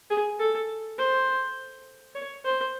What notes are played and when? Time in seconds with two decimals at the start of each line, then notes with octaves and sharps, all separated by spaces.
0.10 G#4
0.39 A4
0.98 C5
2.15 C#5
2.45 C5